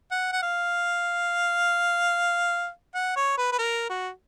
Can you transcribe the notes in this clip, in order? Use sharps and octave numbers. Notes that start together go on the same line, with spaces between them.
F#5
F#5
F5
F#5
C#5
B4
B4
A#4
F#4